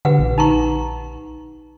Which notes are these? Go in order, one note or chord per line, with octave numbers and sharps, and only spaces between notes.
D3 G4 B4 F#5
A#1
D#4 A#5 C#6